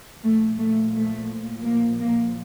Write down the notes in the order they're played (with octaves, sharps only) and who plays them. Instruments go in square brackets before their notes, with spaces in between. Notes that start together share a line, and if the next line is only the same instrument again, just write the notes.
[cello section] A#2 F3 A3
A3
A3
A#3
A#3